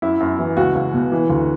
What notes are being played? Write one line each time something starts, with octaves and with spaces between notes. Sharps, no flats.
F#2 E4
F#2
E3
C#2 F#4
C#2
B2
E3
D2